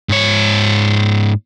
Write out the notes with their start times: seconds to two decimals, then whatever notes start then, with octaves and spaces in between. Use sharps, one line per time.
0.09 G#2 C#5